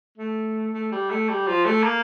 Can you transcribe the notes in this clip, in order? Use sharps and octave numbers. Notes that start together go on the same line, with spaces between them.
A3
A3
G3
A3
G3
F3
A3
A#3